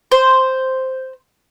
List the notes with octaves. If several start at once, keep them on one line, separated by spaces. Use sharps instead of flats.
C5